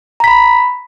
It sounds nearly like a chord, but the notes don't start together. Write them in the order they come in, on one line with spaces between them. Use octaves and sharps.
A#5 B6 B5